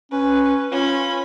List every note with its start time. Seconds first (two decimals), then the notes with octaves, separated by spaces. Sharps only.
0.12 C#4 B4
0.72 C#4 F4 B5